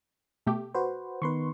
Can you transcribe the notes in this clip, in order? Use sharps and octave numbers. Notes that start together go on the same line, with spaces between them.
B2 A3 G4
F#4 B4 C5
D#3 B3 D#4 B4 C6 C#6